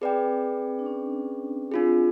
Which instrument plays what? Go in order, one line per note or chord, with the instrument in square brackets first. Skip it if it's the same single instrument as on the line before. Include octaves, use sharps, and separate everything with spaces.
[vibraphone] C4 [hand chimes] G#4 B4 D5 G5
[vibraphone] D4
C#4
[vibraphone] C4 [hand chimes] D4 F4 G#4